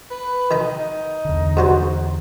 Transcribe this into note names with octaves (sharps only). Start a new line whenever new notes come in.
B4
D#3 D#4 A#5
E2 D3
G2 F#4 C5